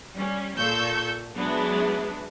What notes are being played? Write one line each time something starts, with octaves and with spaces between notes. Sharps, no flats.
G3 C#4
A#2 A4 C#6 E6 G6
F#3 G#3 B3 D4 E4